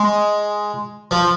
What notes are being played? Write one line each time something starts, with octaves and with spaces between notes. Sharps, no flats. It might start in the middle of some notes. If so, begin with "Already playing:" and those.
Already playing: G#3
F3